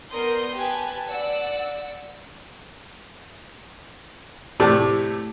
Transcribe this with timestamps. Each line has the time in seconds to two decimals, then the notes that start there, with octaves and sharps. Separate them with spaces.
0.11 B3 A#4 D5 C6 D#6 G6
0.54 G4 B4 G#5 A5
1.08 D5 F#5 E6
4.60 A2 C3 A3 D5 A5